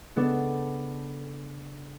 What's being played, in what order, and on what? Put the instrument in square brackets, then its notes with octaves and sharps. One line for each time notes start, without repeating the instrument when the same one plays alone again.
[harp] C#3 B3 D4 A4